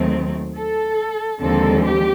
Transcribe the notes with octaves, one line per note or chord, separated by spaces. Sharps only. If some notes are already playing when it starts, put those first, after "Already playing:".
Already playing: D#2 D#3 F#3 A3 C4
A4
D#2 D3 F3 G#3 C4 A4
G4